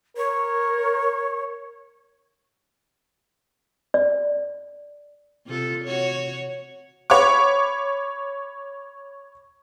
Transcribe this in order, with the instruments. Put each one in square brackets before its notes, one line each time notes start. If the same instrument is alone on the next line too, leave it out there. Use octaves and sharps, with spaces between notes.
[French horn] A#4 [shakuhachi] C#5
[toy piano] D5
[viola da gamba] C3 F4 A4
F#4 C#5
[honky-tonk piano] C#5 B5 C#6 D6